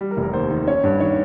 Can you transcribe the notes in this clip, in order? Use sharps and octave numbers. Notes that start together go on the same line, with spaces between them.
G3
A#4
F1
A#4
D#2 C5
D#3
C#4 C#5
G2
D#3 C#5